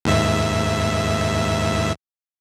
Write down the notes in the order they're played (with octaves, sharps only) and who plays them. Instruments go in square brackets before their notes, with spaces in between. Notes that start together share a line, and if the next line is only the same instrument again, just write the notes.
[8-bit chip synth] D#2 G#2 E5